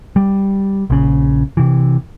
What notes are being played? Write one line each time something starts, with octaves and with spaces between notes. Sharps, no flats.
G3
A#1 C#3
C3 E3